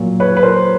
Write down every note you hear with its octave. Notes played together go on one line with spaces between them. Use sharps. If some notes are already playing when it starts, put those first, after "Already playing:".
Already playing: A#2 F#3
B4 C#5
B4
A#4 C5